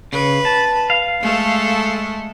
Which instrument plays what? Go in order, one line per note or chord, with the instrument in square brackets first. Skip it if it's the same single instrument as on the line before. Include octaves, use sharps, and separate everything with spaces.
[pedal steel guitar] C#3 [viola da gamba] B4
[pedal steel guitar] A5
F5
[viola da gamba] G#3 A3 A4